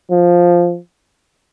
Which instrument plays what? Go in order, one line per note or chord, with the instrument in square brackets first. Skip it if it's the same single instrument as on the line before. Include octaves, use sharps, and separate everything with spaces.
[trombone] F3